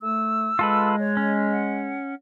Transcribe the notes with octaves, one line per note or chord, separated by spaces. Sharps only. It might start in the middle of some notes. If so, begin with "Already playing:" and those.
A3 E6
G#3 F4 A4 B4
C#5
C#4
F#5